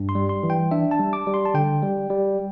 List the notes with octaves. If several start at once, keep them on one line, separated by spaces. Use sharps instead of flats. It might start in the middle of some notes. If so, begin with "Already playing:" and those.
Already playing: G2
C6
G3
C6
E3
G5
D4 E5
A5
G3
D6
G3
C6
A5
D3 G5
G3
G3